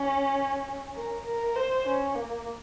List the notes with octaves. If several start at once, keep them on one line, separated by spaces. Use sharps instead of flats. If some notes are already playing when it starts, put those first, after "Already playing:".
Already playing: C#4
A#4
A#4
C5
C#4
A#3